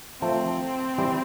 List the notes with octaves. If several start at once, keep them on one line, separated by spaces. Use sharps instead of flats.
F3 A3 C4
E3 G3